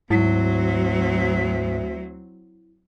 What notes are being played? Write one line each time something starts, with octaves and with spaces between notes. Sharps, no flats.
D2 G#2 F#3 C4 E4